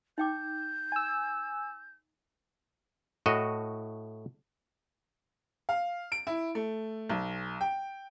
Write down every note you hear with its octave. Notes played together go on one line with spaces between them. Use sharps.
D#4 G5 D6 G6
G#5 E6
A2 F#4 D#5
F5
D7
E4
A3
B1
G5